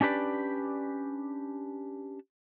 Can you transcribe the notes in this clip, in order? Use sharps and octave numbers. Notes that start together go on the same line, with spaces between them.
C#4 D4 G4 B4 D5